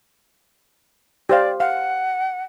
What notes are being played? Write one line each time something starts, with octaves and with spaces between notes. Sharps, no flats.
G4 C5 D5 F5
F5 F#5